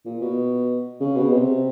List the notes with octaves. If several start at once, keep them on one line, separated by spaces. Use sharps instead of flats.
A#2
B2
C#3
B2
C3